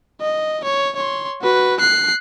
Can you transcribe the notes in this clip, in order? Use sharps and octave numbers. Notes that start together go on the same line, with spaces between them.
D#5
C#5
C#5 C6
F#4 B4
F#6 C7